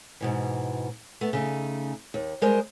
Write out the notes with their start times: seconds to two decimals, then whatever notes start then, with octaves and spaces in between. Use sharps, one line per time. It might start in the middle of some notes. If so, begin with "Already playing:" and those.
0.21 G#2 B2 E3
1.21 A3 B3
1.33 C#3 A3 D#4
2.14 D#2
2.41 G3 G#3 A#4 C5 D#5